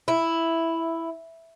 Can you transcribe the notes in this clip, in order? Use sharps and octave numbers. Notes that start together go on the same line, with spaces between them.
E4